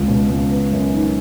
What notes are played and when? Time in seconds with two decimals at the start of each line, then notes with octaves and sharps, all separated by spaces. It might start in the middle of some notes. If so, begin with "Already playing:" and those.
Already playing: C#2
0.08 B2
0.30 C#2
0.50 B3
0.71 F#2
0.93 D#3